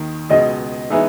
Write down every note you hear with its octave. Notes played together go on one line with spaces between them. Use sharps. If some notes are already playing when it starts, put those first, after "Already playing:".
Already playing: D#2 D#3 A#3
C#2 B2 G#3 D#5
E3 G#3 B3 D#4 G#4 E5